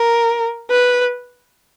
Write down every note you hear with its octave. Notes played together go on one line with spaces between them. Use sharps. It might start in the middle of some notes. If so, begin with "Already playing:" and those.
Already playing: A#4
B4